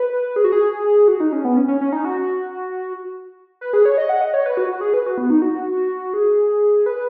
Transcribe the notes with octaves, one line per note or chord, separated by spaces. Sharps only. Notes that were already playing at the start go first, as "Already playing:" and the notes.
Already playing: B4
G#4
F#4
G#4
F#4
D#4
C#4
B3
C#4
C#4
C#4
D#4
F#4
B4
G#4
C#5
D#5
F#5
D#5
C#5
B4
F#4
F#4
G#4
B4
F#4
B3
D#4
F#4
G#4
B4